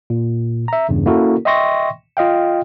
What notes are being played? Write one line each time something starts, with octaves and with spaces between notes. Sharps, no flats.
A#2
E5 A#5
E2 G2 C#3
A#3 C#4 E4 F#4 A4 A#4
D#5 E5 G5 C6 C#6 A#6
F4 D#5 F5 G5